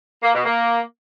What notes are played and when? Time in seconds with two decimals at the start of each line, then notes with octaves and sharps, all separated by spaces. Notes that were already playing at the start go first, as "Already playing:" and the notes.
0.23 A#3
0.34 B2
0.45 A#3